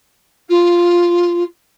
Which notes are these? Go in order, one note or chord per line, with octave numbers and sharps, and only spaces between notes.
F4